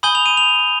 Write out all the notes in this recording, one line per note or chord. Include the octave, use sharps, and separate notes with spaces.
G#5 B5 D#6 G6 G7
F7
D#7
F7